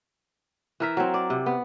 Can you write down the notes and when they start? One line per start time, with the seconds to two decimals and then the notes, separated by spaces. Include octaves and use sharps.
0.80 E3 A#4 E5
0.97 F#3 C4
1.14 D5
1.30 C3
1.46 B3